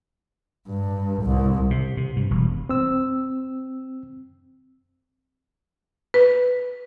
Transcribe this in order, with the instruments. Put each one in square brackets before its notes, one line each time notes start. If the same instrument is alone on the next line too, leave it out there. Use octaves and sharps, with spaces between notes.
[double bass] G2
C2
[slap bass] C3
C3
G2
E1
[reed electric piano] C4 E6
[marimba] B4